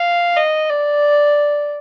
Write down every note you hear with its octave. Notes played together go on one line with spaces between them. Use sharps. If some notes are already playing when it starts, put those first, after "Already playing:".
Already playing: F5
D#5
D5